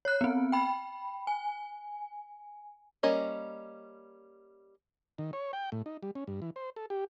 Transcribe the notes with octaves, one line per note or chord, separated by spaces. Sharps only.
C#5 F#6
B3 C4
G5 B5
G#5
G3 A#3 C#4 D#5
D#3
C#5
G5
A2
D#4
G3
C#4
G2
E3
C5
A4
G4